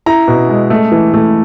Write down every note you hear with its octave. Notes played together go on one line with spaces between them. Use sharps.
E4 A#5
B2
G#3
A3
E3
A3